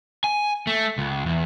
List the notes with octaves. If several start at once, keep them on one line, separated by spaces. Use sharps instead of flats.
G#5
A3
C#2
E2